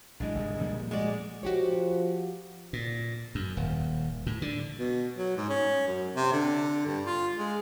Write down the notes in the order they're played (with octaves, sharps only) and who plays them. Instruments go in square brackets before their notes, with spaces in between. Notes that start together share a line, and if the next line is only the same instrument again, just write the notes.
[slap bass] B1 E3 [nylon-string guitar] G#3 D4
[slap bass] G1 C2 G#2
A#2 F3 G3
[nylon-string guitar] G#3 F#4 D5
[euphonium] F3 [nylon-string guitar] F#4 G4 C#5
[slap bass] A#2
F#2
D#1
A2
D3
[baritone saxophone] B2
F#3
G#2
C#4
F#2
C3
D3
G2
F4
G#3